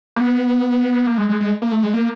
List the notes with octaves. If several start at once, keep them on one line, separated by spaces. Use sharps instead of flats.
A#3
B3
A#3
G#3
G#3
G#3
A#3
A3
G#3
A#3